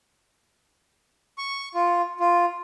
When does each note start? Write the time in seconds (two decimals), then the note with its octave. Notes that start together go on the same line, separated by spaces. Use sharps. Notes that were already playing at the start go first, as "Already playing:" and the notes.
1.38 C#6
1.74 F4
2.20 F4